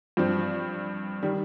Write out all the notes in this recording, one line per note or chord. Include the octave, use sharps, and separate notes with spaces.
G2 F3 C4
D#3 G3